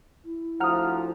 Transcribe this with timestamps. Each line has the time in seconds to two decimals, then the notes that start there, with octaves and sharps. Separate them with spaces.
0.24 E4
0.60 D2 F3 F#5 A#5 D#6 F6